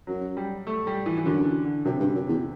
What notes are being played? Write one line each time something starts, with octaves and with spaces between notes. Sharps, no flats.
F#2 F#3
G3
A3
G3
E3
E3
F#2 D3
E3
D3
F#2 C3
G2
F#2
E2